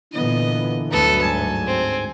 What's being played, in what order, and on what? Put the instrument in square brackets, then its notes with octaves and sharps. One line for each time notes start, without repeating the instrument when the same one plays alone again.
[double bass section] A#2 B3 [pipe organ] D3 E3 [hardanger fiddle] D#5
[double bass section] D2 G2 F#3 [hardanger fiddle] B3 A4
[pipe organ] G#2 G#5 [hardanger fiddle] A5
[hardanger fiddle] C4